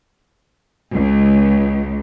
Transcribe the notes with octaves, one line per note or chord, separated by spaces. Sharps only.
C#2